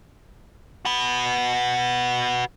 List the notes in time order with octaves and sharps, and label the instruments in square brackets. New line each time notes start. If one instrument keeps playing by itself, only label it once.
[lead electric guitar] F#4 B4